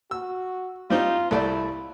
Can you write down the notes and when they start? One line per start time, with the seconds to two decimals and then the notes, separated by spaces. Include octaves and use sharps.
0.11 F#4 E6
0.90 G3 C4 D#4 F4
1.31 C2 A3 E4 D5